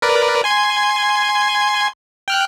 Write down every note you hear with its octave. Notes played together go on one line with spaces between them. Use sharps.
A#4 B4 D5
G#5 C6 G#6
G5 F6 F#6